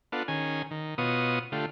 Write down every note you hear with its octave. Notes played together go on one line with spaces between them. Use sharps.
B3 D4 F4 A4 F#5
D#3 C#4 G#4 G#5
D#3
B2 B3 F4 C#5 D#5 D#6
D3 A3 F4 G4